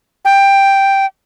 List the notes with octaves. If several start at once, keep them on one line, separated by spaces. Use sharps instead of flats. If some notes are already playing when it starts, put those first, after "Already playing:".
G5